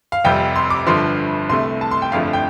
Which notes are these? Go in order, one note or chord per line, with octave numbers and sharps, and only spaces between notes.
F5
F1 F2 C3 G3 G5
C6
D6
G1 G2 D3 F3 C6
C2 C3 A3 C6
A5
C6
G5
G1 F2 D3 F3 A3 F5
G5